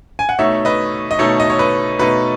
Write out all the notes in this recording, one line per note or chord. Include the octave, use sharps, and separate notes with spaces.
G#5
F#5
B2 A3 D#4 C#5 E5
B4 D#5
D#5
B2 A3 D#4 A4 C#5
D#5
C#5
B4
B2 A3 D#4 B4